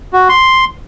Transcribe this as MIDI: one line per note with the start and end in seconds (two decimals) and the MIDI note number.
0.13 0.28 66
0.29 0.65 84